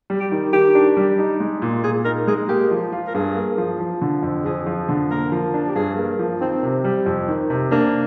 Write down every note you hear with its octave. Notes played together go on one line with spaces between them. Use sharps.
G3
G4
D#3
D#3 G4
D4
G3
D#4
G#3
A#2
A#2 G#4
D#4 A#4
G#3 G#4
A#3 G4
F3
F4
A#4
G2 G#4
A#3
F3
F3
D3
F2
F2 G#4
F3
D3
A#3 A#4
F3
D4
G4
G2 G#4
A#3
F3
D#3 C4
C3
G3
F2
D#3
C3
A#3 D4